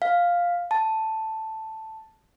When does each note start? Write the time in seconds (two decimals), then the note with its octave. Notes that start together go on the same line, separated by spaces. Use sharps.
0.02 F5
0.71 A5